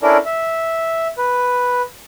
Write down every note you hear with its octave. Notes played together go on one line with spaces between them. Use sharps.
C#4 D4 E4 A4 A#4 D5
E5
B4